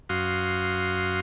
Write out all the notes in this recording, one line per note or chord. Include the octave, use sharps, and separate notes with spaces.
F#2 F#4 F5 C6 D#6